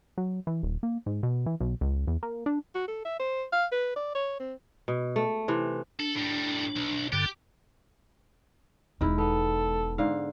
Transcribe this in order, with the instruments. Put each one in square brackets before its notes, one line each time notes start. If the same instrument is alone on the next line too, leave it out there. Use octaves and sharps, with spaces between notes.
[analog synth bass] F#3
E3
D#1
A#3
G#2
B2
E3
B1
C#2
E2
A#3
D4
[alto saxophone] F#4
A4
E5
C5
F5
B4
D5
C#5
C4
[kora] B2
A3
C3 E3
[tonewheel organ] D4 [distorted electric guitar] A4
[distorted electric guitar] A2 G3
B1
[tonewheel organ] G2 D3 [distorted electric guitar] G4
[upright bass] E1 G#3 [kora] D#3 E4
[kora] B3 [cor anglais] A4
[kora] G#2 D3 F5